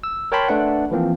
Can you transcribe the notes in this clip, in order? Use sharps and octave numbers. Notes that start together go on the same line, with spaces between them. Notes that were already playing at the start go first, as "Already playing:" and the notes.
E6
A#4 C#5 G5 A5 B5 C6
A3 D4 B4 F#5
E3 F3 A#3 C4